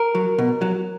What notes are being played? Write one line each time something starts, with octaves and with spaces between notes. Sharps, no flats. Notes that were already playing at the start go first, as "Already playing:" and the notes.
Already playing: A#4
F#3
B2
F#3